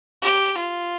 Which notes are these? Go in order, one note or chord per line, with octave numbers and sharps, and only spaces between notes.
G4
F4